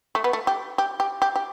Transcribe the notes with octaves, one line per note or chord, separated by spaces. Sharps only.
A3
B3
A3
G4
G4
G4
G4
G4